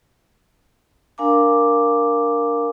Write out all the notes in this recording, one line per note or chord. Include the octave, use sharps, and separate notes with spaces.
D4 A#4 F5 G#5 A#5 D6